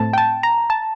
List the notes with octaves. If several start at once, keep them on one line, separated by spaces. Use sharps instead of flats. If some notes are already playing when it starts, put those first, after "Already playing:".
Already playing: A2 A3 C4 A5
G5
A5
A#5
A5